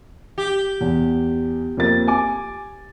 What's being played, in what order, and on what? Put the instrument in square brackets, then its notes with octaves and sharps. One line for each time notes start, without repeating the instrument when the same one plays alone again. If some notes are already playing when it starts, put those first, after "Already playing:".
[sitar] G4
[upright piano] E2
F2 A#3 A6
G#5 D6